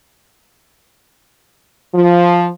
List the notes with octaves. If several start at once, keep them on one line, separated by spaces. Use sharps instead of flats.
F3